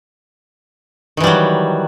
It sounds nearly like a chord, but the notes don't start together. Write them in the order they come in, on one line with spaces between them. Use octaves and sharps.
D#3 E3 G3 F#3